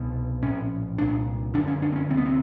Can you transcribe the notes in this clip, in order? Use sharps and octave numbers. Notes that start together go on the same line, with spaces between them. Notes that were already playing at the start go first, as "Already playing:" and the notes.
Already playing: C2 B2
A#1 A2 C#4
C2 A#2 D4
G1 F#2 D3 D4
C#4
D4
C4
C#4
D2 C3 C4
B3
C4